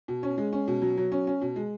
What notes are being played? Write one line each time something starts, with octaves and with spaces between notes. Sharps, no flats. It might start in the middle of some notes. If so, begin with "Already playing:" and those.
B2
C#4
G#3
C#4
B2
F#3
F#3
C#4
C#4
B2
G#3